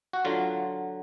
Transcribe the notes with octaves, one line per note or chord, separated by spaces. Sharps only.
F#4
D3 F#3 F4